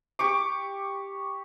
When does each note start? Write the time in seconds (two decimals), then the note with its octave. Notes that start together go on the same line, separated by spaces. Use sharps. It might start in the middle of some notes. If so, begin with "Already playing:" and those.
0.19 G4 C#6 D6